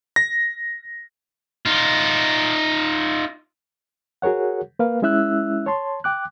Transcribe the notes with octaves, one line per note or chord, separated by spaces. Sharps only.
A#6
D#4 F4
F#4 G#4 A#4 C#5 F#5
A#3 A#4 B4 F5
G#3 C#4 E4 E5 E6 F#6
C#5 A5 C6
G5 D6 F#6